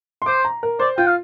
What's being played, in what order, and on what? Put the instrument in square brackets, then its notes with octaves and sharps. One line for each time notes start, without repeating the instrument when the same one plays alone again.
[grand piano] C6
[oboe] C5 [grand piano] D6
[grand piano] A#5
A#4
[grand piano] C5 [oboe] D5
[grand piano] F4 [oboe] G5
[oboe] F5